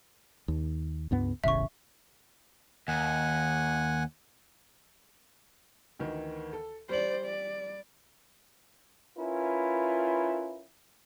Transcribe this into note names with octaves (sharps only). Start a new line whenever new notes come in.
D#2
C#2 G2 B3
E1 A1 C#3 E5 C#6
D#2 F#5 G#5
D2 D#3 E3
A4
G3 C5 D5 F#7
D5
C#4 E4 F4 A#4 B4